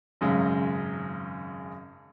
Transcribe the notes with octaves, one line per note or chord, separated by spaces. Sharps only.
G#1 F#2 C#3 G#3